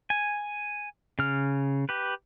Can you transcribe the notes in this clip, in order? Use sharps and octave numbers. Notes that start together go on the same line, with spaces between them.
G#5
C#3 F6
G4 B4